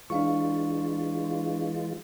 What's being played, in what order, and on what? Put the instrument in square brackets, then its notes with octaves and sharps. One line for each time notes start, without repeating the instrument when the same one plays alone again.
[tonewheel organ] E3 G#3 F4 [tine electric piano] D4 F5 C#6